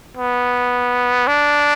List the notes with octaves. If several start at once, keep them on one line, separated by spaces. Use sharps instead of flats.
B3
D4